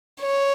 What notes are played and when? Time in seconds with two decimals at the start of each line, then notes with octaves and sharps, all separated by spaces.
0.21 C#5